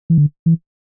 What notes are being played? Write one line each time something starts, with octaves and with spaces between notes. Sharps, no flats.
E3
D3
E3